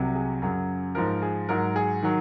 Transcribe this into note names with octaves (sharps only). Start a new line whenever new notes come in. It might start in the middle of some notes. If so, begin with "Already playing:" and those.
Already playing: C2 C3 F#3
G#4
F#2 C#3 F#3
G#2 F3 A#4
G#4
G#2 F#3 A#4
G#4
D#3 F#3